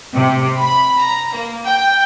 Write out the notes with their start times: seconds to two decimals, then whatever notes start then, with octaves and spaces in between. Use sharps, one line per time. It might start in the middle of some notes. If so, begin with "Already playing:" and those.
0.14 C3
0.57 B5
0.97 A#5
1.33 A#3
1.67 G5